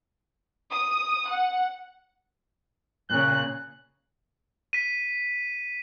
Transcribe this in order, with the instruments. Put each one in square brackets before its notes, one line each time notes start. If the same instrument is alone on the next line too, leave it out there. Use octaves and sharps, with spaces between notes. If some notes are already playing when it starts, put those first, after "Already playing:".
[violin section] D#6
F#5
[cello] A#2 C#3 [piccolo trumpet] F#6
[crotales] B6 D#7